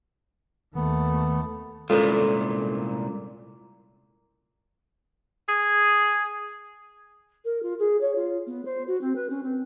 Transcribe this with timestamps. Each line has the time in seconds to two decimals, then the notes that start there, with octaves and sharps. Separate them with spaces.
0.75 D#2 D#3 A3 B3
1.90 C2 A#2 G#3 C#4 F4 A4 B4
5.48 G#4
7.44 A#4
7.62 F4
7.79 G#4
8.00 C#5
8.15 F4
8.46 B3
8.65 C5
8.87 F#4
9.01 C4
9.15 B4
9.29 C#4
9.43 C4